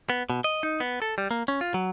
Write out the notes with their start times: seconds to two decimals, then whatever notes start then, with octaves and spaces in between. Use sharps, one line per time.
0.10 B3
0.30 B2
0.44 D#5
0.63 D#4
0.80 B3
1.02 A4
1.18 G3
1.31 A#3
1.48 C#4
1.61 F4
1.74 F#3